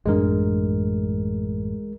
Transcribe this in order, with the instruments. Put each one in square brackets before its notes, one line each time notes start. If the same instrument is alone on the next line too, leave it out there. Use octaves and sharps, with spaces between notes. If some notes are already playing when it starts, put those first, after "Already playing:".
[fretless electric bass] A1 F#2 D4 [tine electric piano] G#3 A#4